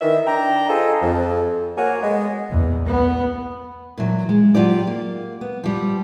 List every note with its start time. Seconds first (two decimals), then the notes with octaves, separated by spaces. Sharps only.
0.01 D#3 E3 E5
0.26 D4 G5 A#5
0.68 F4 G#4 A4 C5 D#5
1.01 F2
1.76 A#3 F#4 C#5 F5 F#5 G#5
2.01 G#3 B3
2.50 E2
2.86 B3
3.97 A#2 E3 F#3
4.29 G#3
4.55 F#3 F4 G4 D5
4.87 A#3
5.41 B3
5.63 F3 G3